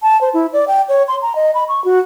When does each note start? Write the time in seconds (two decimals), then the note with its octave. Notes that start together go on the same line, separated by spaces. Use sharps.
0.02 A5
0.21 C5
0.34 E4
0.53 D5
0.68 G5
0.89 C#5
1.08 C6
1.22 A#5
1.36 D#5
1.54 B5
1.68 C#6
1.85 F#4